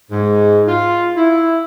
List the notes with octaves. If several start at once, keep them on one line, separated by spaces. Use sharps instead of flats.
G#2
F4
E4